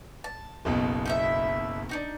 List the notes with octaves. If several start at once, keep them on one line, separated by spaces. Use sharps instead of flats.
A5
F#1 B1 B2
D#4 E4 E5
D4 D#4 F#4